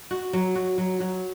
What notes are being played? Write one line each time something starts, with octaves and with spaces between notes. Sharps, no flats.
F#4
F#3
F#4
F#3
F#3